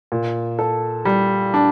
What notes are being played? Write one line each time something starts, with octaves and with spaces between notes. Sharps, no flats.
A#2
A4
G3
D4